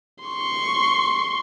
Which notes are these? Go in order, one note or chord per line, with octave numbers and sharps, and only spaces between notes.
C6 C#6